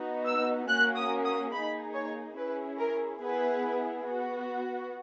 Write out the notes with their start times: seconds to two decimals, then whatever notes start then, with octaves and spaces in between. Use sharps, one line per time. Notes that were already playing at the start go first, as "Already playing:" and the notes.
Already playing: B3 D#4 F#4
0.26 E6
0.68 A#3 C#4 F#4 F#6
0.96 D#6
1.25 D#6
1.52 A#3 D#4 G#4 B5
1.94 C#5
2.37 C#4 E4 G#4 B4
2.79 A#4
3.22 B3 E4 G#4 B4
4.06 B3 F#4